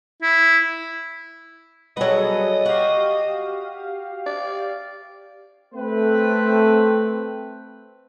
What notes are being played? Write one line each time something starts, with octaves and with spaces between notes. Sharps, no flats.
E4
F#3 G3 B3 G#4 A4 D#5
F#4 G4 F5
D5
A3 C4 B4